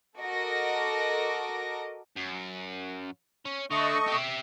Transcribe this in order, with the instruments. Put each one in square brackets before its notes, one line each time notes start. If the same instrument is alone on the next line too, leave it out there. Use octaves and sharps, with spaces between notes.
[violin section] F#4 A4 A#4 D#5 D6 A#6
[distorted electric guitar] F#2
C#4
[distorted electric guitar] D3 [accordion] A3 D#5 C#6
[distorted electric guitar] G4 E5